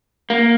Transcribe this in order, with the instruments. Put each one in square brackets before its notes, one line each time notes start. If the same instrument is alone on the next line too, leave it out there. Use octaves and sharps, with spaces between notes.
[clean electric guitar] A#3